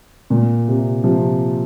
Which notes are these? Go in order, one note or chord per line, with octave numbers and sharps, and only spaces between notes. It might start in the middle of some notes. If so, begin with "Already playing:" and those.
A#2
C3
C3 F3